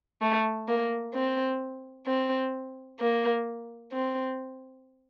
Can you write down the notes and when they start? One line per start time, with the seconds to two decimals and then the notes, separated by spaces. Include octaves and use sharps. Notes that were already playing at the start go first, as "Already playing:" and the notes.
0.22 A3
0.68 A#3
1.14 C4
2.07 C4
3.00 A#3
3.92 C4